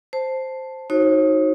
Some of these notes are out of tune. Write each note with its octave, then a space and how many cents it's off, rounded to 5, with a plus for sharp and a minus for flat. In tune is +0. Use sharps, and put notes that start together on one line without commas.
C5 +0 A5 +0
D#4 +15 F#4 +0 C#5 -45